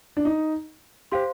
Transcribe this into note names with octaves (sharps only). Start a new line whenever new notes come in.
D4
D#4
G4 C5 F5 C6